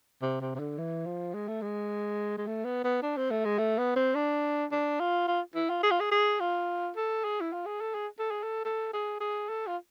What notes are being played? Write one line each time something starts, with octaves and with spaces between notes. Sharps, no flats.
C3
C3
C3
D3
E3
F3
G#3
A3
G#3
G#3
A3
B3
B3
D4
C4
A3
G#3
A3
B3
C4
D4
D4
F4
F4
E4
F4
G#4
F4
G#4
G#4
F4
A4
G#4
E4
F4
G#4
A4
G#4
A4
G#4
A4
A4
G#4
G#4
A4
F4